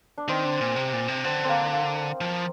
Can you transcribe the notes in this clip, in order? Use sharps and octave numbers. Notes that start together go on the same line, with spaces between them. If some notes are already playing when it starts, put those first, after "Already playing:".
D4
D#3 C4
D3
A#2
C3
A#2
C3
D3 C4
C4
A#3
A#3
F3